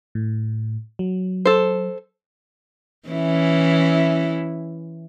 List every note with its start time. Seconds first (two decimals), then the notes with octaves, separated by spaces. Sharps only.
0.15 A2
0.99 F#3
1.45 A4 C5
3.08 E3 C#4 E4